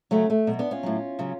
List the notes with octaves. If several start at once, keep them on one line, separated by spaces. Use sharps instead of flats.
C#3 F#3 A3 C#4
A3
B2 F#3
B3 D4
C#4 F4
A2 F#3
C#3 F#3